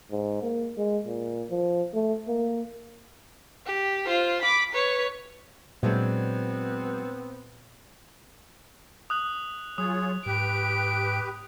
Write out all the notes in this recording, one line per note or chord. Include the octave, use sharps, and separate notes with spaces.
G#2
A#3
G#3
A#2
F3
A3
A#3
G4
F4 C5
B5 D6
B4 C#5
A#2 F#3 G#3 B3 C4 D4
D#6 F#6 F#7
F#3 F4 G#4 C#5 D#6
G#2 G4 B4 D7